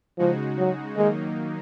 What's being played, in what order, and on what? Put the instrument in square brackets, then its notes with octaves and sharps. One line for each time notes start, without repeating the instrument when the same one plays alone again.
[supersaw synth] C#3 G#3 D#4 F#4 [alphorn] F3
[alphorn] F#3
[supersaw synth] D#3 F#3 A#3 D#4 [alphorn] G#3